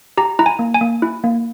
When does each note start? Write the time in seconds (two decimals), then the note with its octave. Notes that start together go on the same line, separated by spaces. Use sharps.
0.17 G4 A#5
0.39 E4 A#5
0.46 G#5
0.59 A#3
0.74 G#5
0.81 A#3
1.02 E4
1.24 A#3